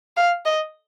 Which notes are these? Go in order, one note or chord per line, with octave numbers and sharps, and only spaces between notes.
F5
D#5